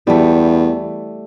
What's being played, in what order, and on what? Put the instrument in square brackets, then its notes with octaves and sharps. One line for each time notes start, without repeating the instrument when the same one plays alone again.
[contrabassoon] E2 [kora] G3 A3